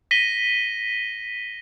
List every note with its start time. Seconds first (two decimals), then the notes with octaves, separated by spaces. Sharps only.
0.11 A#6 B6 D#7 G7